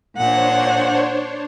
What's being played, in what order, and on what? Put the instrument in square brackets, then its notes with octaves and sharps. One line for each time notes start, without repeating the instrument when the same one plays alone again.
[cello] A#2 F#5 [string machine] D4 C5 C#5